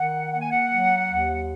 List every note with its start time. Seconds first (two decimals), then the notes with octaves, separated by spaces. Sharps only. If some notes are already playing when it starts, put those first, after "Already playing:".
Already playing: D#3 F#5
0.31 A#3 F#5
0.41 G#5
0.50 F#5
0.69 F#3
1.08 D#2